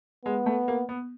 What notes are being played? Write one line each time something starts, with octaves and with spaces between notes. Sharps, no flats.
G#3 B3
A3
A#3
B3